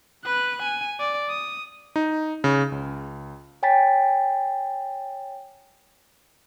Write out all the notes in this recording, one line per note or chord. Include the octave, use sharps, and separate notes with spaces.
B4 F#6
G#5
D5
D#6
D#4
C#3
C#2
C#5 G5 G#5 A#5 A6 B6